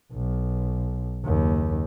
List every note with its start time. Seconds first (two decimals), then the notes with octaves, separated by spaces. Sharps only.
0.13 B1
1.23 F#1 D#2